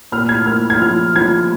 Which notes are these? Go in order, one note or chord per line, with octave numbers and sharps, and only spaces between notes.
A#2 F6
G#6
A#3 F6
G#6
F3 F6
F3 G#6